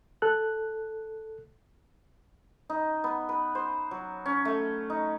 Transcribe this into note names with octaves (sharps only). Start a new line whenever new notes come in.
A4 F#6
D#4
B3
B4
C5
F#3
C#4
A3
D#4